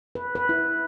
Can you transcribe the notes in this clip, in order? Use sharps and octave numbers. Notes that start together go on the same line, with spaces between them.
B4
B4
E4